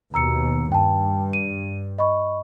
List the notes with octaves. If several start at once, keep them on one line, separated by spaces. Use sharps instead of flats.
D#2 B2 A#5 E6 C#7
G2 G5 A5
D#7
D#5 B5 C#6